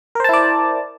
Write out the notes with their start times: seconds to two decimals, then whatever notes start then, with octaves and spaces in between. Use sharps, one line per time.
0.15 A#4
0.20 C5
0.24 A5
0.29 E4
0.33 D5